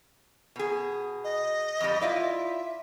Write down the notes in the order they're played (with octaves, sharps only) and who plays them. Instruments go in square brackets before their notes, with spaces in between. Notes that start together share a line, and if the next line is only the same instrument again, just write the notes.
[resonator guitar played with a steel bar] B2 G#4
[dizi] D#5
[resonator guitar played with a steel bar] F2 G3
[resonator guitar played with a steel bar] E4 F4 D5 [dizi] E5